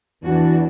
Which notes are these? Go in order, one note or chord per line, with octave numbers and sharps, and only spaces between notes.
E2 E3 D4 F#4